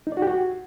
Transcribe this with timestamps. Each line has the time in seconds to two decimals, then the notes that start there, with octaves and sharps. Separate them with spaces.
0.07 D#4
0.12 D5
0.17 F#4
0.22 G4
0.27 F#4